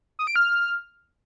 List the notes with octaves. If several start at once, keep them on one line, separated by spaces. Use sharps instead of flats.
D#6
D7
F6